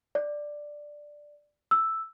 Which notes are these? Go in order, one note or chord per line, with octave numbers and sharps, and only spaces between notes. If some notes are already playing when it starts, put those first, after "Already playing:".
D5
E6